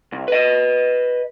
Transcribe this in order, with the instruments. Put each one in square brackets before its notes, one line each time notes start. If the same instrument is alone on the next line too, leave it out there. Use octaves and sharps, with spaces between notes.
[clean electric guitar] C2
B4 D#5